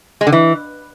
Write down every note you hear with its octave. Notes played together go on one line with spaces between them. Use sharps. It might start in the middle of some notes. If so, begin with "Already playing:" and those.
G#3
D3
E3